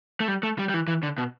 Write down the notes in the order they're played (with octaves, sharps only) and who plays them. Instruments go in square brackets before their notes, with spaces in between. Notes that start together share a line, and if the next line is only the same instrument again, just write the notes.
[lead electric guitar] A3
G3
A3
G3
G3
E3
E3
D3
B2